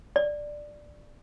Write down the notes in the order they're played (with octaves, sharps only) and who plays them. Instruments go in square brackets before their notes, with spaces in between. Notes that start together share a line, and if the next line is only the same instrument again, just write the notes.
[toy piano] D5